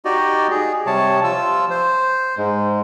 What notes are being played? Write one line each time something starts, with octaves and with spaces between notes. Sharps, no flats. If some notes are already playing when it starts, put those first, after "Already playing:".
D#4 F#4 G4 D5 D#5
G#4
C3 G3 C#5 A5
F3 F4 E6
C5
G#2 G#3